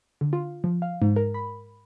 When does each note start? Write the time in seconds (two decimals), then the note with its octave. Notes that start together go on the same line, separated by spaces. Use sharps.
0.21 D3
0.33 F4
0.64 F3
0.82 F5
1.02 G#2
1.16 A#4
1.34 B5